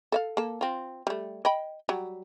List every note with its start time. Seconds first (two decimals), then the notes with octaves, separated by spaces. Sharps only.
0.12 A4 E5 F5
0.37 A#3 A4
0.61 C4 F4
1.07 G3 A3
1.45 D#5 G5 B5
1.89 F#3 G3